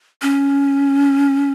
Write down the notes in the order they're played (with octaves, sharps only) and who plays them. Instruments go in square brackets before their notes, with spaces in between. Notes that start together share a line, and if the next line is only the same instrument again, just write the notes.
[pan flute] C#4